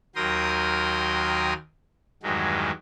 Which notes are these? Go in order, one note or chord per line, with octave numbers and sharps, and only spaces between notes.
D#2 F#3 A#4 G5 C6 D#6
E2 G2 D#3 F#3 G#3